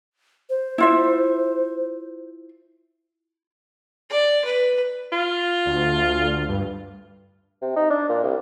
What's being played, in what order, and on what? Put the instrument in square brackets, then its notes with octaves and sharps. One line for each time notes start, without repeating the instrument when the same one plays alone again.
[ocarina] C5
[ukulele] E4 F4 E5
[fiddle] D5
B4
[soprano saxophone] F4
[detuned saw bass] D2
G2
[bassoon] C3
D#4
D4
A#2
C2